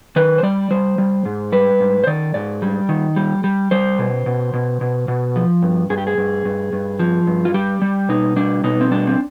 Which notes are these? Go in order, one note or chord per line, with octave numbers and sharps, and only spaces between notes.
D#3 B4
C5
G3 D5
G3 C5
G3
G#2
G3 B4
G#2
C5
D#3 D5
G#2 D5
G3
D#3
G3
G3
G3 C5
B2
B2
B2
B2
B2
F3
G2
G2 G#4
G4
G#4
G2
G2
G2
F3
G2
F4
G3 G4
G3
B2 D#4
G3 D4
B2 D#4
C4
G3 D4
C4